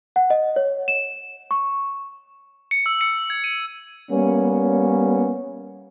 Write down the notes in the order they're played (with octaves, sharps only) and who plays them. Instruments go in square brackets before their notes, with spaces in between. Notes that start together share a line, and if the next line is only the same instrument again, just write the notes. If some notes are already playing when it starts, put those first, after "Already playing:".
[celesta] F#5
D#5
C#5
E7
C#6
[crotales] C#7
E6
C#7
G#6
D#7
[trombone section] G3 A#3 B3 C#4